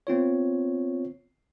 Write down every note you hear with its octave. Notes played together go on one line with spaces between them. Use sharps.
B3 C4 F4 C#5